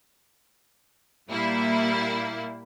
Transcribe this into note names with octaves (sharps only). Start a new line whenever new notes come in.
A#2 G3 A#3 E4